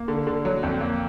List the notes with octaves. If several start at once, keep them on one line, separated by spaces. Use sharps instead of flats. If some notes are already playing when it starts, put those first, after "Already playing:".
Already playing: A#3
D3
D3
F#3
F2
A#3